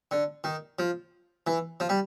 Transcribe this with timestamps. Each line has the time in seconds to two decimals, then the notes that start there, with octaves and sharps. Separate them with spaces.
0.11 D3
0.44 D#3
0.79 F3
1.47 E3
1.80 F3
1.89 G3